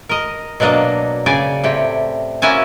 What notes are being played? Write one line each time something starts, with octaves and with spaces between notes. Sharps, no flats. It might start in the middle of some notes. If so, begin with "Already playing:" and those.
A#4 D#5
B2 F#3 A#3 D4 D#5
C#3 D5 G#5
A2 C3 G4
A#3 C#4 E4 F#4 G#5 A5